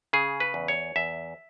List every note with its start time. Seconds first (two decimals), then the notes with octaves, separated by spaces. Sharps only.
0.13 C#3 G#4
0.40 B4
0.54 E2
0.68 C#5
0.96 E2 E5